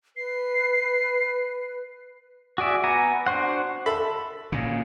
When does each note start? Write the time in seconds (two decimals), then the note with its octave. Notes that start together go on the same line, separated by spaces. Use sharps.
0.17 B4 C7
2.58 F#4 G#4 D5 E5
2.84 B3 F#5 G#5 A#5
3.27 D4 F#4 C5 F#5
3.86 A4 E5 B5
4.52 A#2 C#3